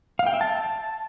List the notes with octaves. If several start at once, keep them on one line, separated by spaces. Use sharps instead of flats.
F5
G5
E5
A5